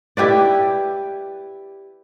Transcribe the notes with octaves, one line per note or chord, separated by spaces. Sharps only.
E4 G4 B4 D5